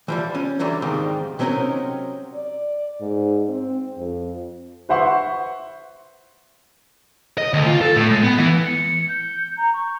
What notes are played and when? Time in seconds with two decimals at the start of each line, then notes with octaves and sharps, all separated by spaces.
0.08 E3 F3 G3
0.35 C#4
0.60 D3 E3 F#3 G3
0.82 D#2 G#2 D#3 G3 C4 F5
1.39 C3 F#3 C4 C#4 D#4 A#4
2.35 D5
3.01 G#2
3.49 C4
3.97 F2
4.89 B4 C5 E5 F#5 C6 C#6
7.38 D#5
7.54 D2
7.66 F4
7.81 A4
7.96 A2
8.11 G#3
8.24 B3
8.38 E3
8.65 C#7
9.08 G6
9.57 A#5
9.73 C#6